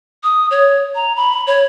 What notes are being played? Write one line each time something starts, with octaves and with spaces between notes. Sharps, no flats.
D#6
C#5
A#5
B5
C#5